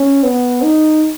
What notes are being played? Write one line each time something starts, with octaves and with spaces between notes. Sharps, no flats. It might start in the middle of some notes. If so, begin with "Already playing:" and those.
Already playing: C#4
B3
D#4